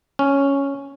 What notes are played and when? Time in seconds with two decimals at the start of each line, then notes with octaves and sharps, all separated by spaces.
0.19 C#4